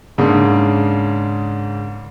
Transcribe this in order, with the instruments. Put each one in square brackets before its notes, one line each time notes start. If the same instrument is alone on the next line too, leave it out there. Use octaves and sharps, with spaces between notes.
[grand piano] G#2 C#3 A#3 D4